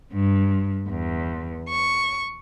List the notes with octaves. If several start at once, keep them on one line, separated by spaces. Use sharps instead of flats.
G2
E2
C#6